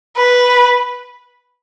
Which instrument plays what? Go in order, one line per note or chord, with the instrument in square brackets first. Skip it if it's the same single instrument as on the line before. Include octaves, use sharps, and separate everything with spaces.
[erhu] B4